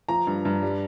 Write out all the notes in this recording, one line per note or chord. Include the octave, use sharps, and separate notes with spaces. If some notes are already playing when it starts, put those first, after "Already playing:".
F3 A#5
G2
G2
G3